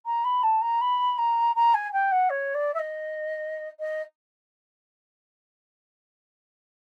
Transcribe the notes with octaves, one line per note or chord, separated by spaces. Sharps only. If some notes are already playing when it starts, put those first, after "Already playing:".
A#5
B5
A5
A#5
B5
A#5
A#5
G#5
G5
F#5
C#5
D5
E5
D#5
D#5